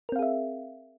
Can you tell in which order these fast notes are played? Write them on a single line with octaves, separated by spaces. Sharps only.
A#4 C4 F5 G#4 E5